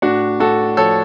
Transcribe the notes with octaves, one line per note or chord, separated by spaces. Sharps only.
A2 D4 F#4
A2 F#4 A4
F3 A4 C#5